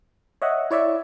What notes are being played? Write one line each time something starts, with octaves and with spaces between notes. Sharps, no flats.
C#5 D#5 E5 F#5
E4 C#5 D5 E5